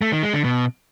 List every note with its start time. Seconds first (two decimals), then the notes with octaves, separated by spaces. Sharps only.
0.02 A3
0.12 D#3
0.23 G#3
0.34 D3
0.44 B2